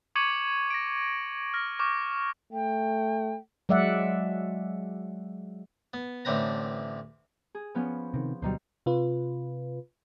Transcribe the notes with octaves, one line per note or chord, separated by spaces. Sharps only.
C#6 D6 G#6 C#7 D#7 F#7
A#6 D7
F6 A#6
C#6 D6 F6 G6
A3 G5
F#3 G#3 D5 E5 F#5
B3
A1 A2 D3 C4 B4 A#5
G#4
F3 B3 C#4
C3 D#3
D2 B2 F#3 G3 D#4 C5
C3 F4 B4